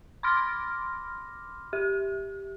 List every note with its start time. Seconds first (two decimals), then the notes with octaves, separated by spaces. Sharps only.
0.23 B5 C6 D6 F6 A#6
1.73 G4